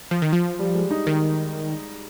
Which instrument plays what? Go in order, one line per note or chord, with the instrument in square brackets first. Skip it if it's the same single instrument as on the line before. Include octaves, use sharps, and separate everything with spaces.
[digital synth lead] F3
D#3
F3
[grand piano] G3
G#3
D#4
[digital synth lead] D#3